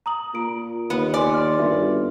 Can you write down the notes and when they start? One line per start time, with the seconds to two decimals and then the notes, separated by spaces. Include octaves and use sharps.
0.06 A#5 D#6 F#7
0.34 A#2 F4 D7
0.90 D#2 B3
1.14 D5 G#5 C6
1.34 C6 F6
1.59 G1 F#4 E5